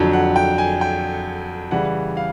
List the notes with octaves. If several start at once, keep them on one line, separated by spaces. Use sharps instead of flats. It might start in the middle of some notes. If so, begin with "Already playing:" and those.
Already playing: F2 D3 F#3
F#5
G5
G#5
G5
C#3 E3 G3 F#5
F5